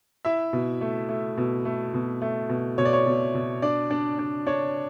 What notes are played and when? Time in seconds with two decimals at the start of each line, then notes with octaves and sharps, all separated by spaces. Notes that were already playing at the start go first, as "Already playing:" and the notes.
0.25 E4 E5
0.53 B2
0.81 A3
1.09 A3
1.37 B2
1.65 A3
1.94 B2
2.22 A3
2.49 B2
2.78 B2 C#5
2.85 D5
2.93 C#5
3.06 B2
3.34 B2
3.62 D4 D5
3.91 D4
4.19 D4
4.47 D4 C#5